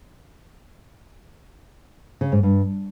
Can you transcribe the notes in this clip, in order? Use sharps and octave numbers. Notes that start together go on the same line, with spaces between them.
C#3
G#2
G2